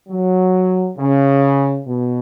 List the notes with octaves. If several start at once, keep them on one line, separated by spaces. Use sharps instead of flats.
F#3
C#3
B2